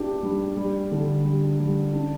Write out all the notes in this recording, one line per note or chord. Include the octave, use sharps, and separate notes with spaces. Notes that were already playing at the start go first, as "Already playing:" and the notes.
Already playing: D4 G4
G3
G3
D3
G3
G3
D4